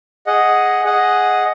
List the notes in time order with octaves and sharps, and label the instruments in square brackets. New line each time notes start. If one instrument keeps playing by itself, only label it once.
[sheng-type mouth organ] G#4 D#5 F#5
G#4 D#5 F#5